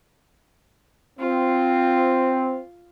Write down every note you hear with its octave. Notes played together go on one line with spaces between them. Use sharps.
C4 F4